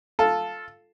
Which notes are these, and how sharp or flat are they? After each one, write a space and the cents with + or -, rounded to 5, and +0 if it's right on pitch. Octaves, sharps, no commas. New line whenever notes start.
F4 +0 A4 -5